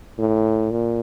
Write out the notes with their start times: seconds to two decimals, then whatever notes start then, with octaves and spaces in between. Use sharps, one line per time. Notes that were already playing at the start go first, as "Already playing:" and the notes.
0.19 A2
0.71 A#2